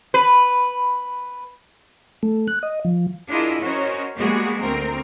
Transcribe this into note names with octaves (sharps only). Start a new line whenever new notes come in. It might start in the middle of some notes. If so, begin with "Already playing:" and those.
B4
A3
F#6
D#5
F3
D4 E4 F4 G#4 A#4 D#5
C#4 F#4 A#4 C5 C#5 D#5
G3 G#3 A#3 B3 F#4 G#4
D2 C4 A#4